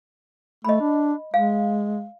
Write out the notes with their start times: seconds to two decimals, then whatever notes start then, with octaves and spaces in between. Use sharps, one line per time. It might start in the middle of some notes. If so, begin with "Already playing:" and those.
0.64 A3 D#5 B5
0.80 D4
1.34 G#3 F5